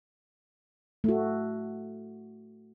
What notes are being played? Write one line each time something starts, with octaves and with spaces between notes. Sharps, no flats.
A3 F#4